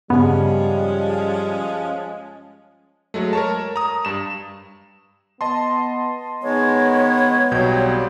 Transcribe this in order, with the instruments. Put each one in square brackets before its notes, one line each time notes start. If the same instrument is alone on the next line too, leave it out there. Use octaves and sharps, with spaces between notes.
[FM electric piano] G2 C#3 G#4 [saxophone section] F3 G#3 C#4 [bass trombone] G3 [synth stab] B3
[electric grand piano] F#3 G#3 A3
A#4 C#5 A5
A#5 D#6
G2 E7
[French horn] B3 [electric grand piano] D#5 A5 C6
[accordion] D#3 G#3 [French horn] B3 [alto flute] C#5
[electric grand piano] B1 B2 G6 [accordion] F#3 G3 C4